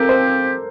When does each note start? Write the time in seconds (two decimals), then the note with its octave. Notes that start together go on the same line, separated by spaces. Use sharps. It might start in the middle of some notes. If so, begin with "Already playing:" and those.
Already playing: F3 C4 G4 A4 A#4
0.09 C5